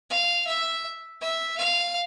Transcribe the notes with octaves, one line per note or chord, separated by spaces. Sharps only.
F5
E5
E5
F5